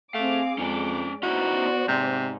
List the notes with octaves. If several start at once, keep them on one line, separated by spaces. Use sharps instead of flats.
A3 C4 G#4 F5 D6
F2 G#3 C#4 D5 D6
B3 C#4 D#4 E4 F#4 C5 D5
G#2 C3